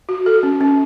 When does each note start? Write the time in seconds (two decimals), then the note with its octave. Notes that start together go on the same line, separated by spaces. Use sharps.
0.09 F#4
0.26 A4
0.43 C#4
0.61 C#4